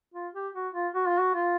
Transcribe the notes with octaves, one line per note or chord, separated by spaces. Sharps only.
F4
G4
F#4
F4
F#4
F4
F#4
F4